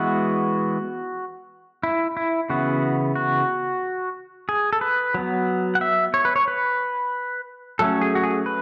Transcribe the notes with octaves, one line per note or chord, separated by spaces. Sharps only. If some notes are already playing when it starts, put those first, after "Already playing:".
Already playing: E3 G#3 B3 F#4
E4
E4
C#3 E3 B3 F#4
F#4
G#4
A4
B4
F#3 B3
F#5
E5
C#5
B4
C#5
B4
F#3 A3 C#4 A4
G#4
F#4
G#4
B4